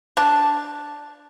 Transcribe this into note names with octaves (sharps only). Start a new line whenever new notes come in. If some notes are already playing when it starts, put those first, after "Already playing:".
D4 A5